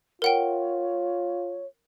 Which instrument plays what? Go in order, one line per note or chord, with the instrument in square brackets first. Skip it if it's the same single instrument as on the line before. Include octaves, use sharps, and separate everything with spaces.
[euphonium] F4 [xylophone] A#4 F#5 G5 [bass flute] C#5